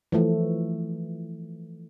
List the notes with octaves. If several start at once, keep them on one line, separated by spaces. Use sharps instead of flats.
E3 F3 A3